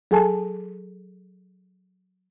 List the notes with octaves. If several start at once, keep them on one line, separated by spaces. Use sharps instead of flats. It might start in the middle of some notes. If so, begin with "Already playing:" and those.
F#3 G#4 A4 G#5 A5